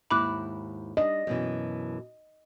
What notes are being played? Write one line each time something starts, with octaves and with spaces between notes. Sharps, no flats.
D#2 G#2 E4 B5 D6 F#6
G3 D4 D#5
F#2 B2 E3